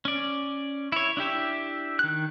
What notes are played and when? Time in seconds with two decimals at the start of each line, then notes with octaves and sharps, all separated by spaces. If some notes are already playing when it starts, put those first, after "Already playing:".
0.05 C#4 D5
0.92 E4 C#5
1.17 D4 E4 G4 E5
1.99 D#3 F#6